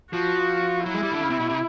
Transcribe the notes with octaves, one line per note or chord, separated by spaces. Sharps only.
F3 F#4
F#3 E4
G#3
G3
D3
C#3
C3
B2
C3